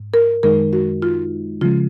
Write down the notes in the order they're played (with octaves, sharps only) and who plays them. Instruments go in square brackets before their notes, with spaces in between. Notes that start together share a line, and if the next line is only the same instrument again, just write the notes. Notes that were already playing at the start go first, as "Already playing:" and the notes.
Already playing: [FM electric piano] G#2
[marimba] A#4
[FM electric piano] F#2 D#3 G#3 D#4 [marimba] A#4
[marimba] F#4
F4
[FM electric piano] C#3 F3 G#3 [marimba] F4